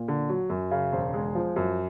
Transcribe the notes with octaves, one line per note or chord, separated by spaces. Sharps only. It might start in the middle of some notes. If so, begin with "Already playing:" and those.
Already playing: A#2
D3
F#3
F#2
C#3
E1 C5
G#3
F3
F#2